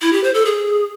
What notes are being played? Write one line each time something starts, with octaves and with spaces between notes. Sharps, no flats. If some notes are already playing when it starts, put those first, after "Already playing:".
E4
G4
C5
A4
G#4